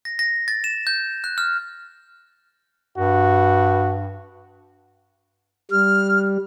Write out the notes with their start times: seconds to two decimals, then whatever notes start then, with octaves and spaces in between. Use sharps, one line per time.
0.05 A#6
0.19 A#6
0.48 A6
0.64 E7
0.87 G6
1.24 F#6
1.38 F6
2.98 G2 F#4
5.71 G3 F6